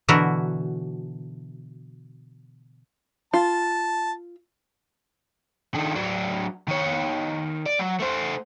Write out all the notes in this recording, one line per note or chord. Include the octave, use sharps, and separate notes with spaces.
B2 D3 E3 E4 F#4 A#4
F4 A5
D#3 D4
F#3 D4
D#3 C#5
D5
F#3
A3 C5